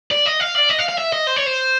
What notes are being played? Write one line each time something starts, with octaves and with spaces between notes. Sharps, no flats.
D5
D#5
F5
D5
D#5
F5
F5
E5
D#5
C5
C#5
C5